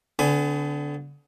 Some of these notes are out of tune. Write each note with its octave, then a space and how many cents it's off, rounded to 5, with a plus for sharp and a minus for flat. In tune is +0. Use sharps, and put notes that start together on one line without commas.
D3 -20 B3 +35 G#5 +0